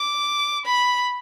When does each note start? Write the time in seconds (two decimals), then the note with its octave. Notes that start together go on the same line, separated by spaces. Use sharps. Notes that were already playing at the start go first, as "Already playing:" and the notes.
Already playing: D6
0.66 B5